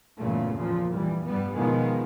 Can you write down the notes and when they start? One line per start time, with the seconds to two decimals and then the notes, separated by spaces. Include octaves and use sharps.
0.18 E2 G2 A#2 C#3 A3
0.57 A#2 C#3 F3
0.92 F1 E3 G3
1.26 G2 G3 B3
1.55 B2 D#3 F3 G#3 B3